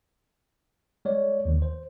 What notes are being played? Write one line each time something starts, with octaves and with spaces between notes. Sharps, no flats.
G#3 C#5 D5
D#2 D#3
C5